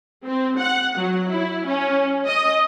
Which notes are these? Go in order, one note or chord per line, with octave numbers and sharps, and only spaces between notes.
C4
F#5
F#3
E4
C#4
D#5